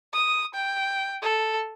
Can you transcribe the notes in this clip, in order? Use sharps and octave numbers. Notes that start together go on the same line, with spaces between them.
D#6
G5
A4